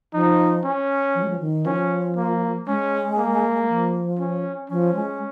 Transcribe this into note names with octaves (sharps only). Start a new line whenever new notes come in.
F3 D#4
C#4
F3
G#3
F3
D#3
F3 C#4
A#3
G#3 C#4
A#3
F3
C#4
F3 C#4
G#3